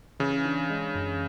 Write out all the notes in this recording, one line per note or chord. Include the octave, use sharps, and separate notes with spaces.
C#3 E3
D4
G#3
F#2